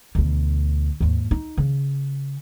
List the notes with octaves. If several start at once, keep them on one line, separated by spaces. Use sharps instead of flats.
D2 B2
D#2 G#2
D#4
C#3